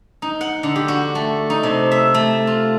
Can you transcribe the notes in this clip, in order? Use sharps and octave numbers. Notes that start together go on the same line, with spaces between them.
D#4
F#5
D3
G4
F#4
A3
D#4
C3
E5
A3
F4